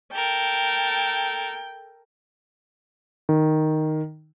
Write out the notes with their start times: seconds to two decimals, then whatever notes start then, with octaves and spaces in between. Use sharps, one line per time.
0.13 A4 A#4 G5
3.29 D#3